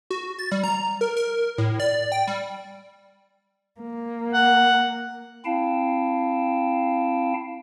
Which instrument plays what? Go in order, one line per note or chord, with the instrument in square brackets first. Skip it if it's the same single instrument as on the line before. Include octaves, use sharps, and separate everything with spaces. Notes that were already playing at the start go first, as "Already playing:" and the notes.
[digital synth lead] F#4
A6
G3
A#5
A#4
A#4
A2
D5
G5
G3
[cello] A#3
[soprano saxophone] F#5
[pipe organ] C4 E4 F5 G5 A5